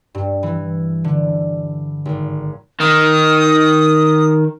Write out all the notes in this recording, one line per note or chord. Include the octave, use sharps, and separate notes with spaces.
G2
E3
D3
G#1
D#3 D#6